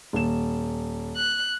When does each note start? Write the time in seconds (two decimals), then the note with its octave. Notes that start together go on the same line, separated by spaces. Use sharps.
0.13 D#1 E7
1.17 F#6